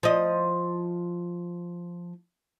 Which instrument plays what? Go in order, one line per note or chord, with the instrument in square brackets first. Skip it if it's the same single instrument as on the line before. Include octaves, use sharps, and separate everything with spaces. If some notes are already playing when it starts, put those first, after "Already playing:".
[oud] F3 D#5